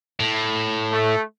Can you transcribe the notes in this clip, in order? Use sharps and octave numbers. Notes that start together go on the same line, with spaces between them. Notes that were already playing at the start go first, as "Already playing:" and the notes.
A2
A3